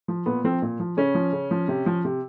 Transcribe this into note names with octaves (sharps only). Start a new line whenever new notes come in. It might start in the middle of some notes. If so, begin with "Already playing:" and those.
F3
A#2 B3
F3 C4
A#2
F3
C#3 C#4
F3
C#3
F3
C3
F3
C3